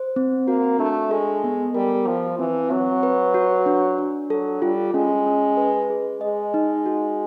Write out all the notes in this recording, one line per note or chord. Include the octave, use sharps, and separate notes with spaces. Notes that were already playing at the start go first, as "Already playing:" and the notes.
Already playing: C5
C4
A#3 F#4
A3 D4
G#3 A4
B3
G3 A#4
F3 F4
E3 C4
F#3 C4
B4
F#4
D4
D4
F#3 A4
G3 F4
G#3 C#4
C#4
B4
G#4
G#3 D#5
D#4
F#4